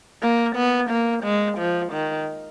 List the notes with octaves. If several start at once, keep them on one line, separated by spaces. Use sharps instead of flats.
A#3
B3
A#3
G#3
F3
D#3